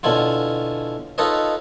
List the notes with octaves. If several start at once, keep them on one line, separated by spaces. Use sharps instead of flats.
B2 D3 C#4 E4 F4
D#4 F4 A4 B4 C#5 D#5